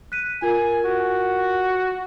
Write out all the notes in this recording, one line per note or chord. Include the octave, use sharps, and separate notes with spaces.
F#6 B6 D#7
F4 A#4 G#5
F#4